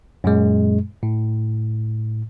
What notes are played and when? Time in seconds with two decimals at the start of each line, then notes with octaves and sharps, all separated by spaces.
0.24 F#2 A#2 G#3
1.03 A2